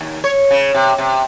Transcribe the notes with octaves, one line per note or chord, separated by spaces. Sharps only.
D#2
C#5
C#3
C3
C3